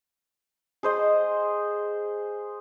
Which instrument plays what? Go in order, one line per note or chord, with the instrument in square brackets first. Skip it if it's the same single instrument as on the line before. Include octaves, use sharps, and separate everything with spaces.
[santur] G#4 C5 D#5